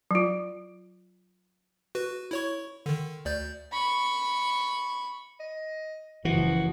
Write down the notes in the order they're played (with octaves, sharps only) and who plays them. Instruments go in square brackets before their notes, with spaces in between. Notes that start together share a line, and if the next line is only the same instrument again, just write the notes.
[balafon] F#3 F4
[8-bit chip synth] F#4 B4
E4 C#5 C#6
D3 D#3
D2 D5 G6
[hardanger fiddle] B5 C#6
[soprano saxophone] D#5
[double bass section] F#1 F3 [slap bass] E3 [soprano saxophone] F#4